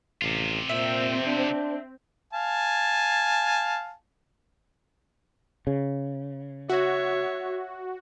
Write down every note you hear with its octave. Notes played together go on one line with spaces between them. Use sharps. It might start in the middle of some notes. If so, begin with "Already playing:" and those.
A1 C3 F4
A#2 C4 E5
D4
F5 G#5 A5
C#3
F#4 C#5 E5